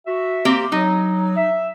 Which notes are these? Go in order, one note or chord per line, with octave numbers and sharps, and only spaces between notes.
F#4 E5
A#3 C4 G4
F#3 D#4
E5